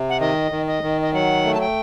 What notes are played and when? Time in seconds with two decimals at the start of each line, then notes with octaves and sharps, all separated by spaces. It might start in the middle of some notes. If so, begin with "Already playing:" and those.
Already playing: C3
0.09 F#5
0.20 D#3 D#5
0.51 D#3
0.67 D#5
0.83 D#3
1.02 D#5
1.13 F#3 F#5
1.45 A3
1.54 A5
1.60 G5